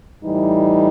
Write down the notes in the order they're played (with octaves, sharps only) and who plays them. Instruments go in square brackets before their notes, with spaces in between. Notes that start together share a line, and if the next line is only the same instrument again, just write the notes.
[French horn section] A2 E3 G3 D#4